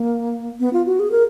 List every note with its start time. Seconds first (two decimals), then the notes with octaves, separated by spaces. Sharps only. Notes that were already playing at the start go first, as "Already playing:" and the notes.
Already playing: A#3
0.60 B3
0.73 F4
0.86 F#4
1.00 G#4
1.12 A#4